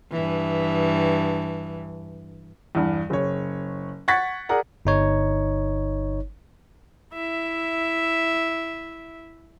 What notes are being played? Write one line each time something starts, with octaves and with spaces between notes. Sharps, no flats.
G2 E3
E2 G2
F#1 C#5
F#5 C#6 G#6 A6 B6
G#4 A#4 D5 F#5
G1 D#4 C#5
E4 E5